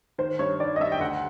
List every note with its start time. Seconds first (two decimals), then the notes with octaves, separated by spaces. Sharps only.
0.18 D#3 C5
0.39 G2 C#5
0.60 D#3 D5
0.76 D#5
0.80 G2 E5
0.92 G5
1.00 D2 F#5